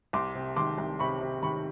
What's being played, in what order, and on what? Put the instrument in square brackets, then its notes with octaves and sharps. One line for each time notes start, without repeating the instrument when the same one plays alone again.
[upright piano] C2 C6 D6
C3
D#3 C6 D6
C2
C3 B5 C#6
C3
D#3 B5 C#6